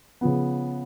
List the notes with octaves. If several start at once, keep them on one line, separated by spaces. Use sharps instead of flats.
C#3 F3 B3